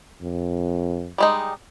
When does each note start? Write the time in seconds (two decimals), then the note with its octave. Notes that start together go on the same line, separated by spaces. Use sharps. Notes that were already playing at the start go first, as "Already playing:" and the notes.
0.21 F2
1.18 G3 G#3 D#4